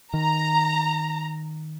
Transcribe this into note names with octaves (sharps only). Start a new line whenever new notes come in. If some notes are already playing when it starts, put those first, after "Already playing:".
D#3 A#5